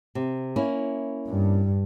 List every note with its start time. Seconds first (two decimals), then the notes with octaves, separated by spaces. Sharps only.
0.15 C3
0.56 A#3 C#4 E4
1.29 G2